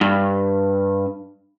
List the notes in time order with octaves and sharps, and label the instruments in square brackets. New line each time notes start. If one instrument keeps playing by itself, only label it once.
[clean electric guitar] G2